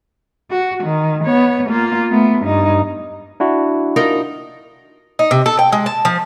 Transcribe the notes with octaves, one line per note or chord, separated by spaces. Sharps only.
F#4
D#3
B3 C#5
A#3 F4
A3 B3
G2 D#4
D4 E4 F#4
D#4 F4 A#4
D#4
C3
A4
G5
G#3
A5
F3